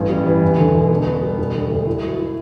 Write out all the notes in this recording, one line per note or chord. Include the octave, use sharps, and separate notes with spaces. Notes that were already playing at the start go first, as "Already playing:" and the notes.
Already playing: A1 G2
G3
E3
E2
D3
E1
B3
B3
G3
E1
D3
D2
E4
F#3
E4